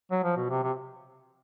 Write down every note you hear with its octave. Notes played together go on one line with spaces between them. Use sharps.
F#3
F3
B2
C3
C3